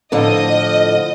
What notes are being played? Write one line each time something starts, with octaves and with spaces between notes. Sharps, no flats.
A2 D3 F3 D#5